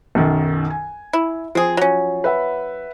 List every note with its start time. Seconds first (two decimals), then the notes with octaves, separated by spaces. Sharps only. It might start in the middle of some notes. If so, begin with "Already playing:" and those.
0.15 B1 F#2 D#3
0.70 G#5
1.13 E4
1.55 F3 C4 G#4
1.77 F#3 C#4
2.24 B4 E5 F#5